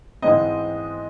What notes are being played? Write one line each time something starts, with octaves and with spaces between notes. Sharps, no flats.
G#2 E3 G#3 C4 D#5